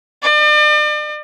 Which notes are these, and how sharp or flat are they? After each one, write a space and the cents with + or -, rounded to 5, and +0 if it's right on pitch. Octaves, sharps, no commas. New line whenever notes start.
D5 +40